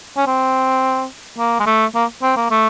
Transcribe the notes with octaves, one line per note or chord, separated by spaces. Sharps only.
C#4
C4
A#3
G#3
A3
A#3
C4
A#3
A3